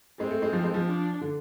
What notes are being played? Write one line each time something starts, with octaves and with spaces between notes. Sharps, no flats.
G#3 C4
A3
G#3
F3
G#3
F3
D4
D3